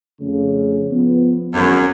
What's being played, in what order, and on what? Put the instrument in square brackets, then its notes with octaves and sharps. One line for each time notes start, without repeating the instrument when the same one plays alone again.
[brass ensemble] F2 C#3 A3
F3 B3
[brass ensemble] G#1 [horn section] F#2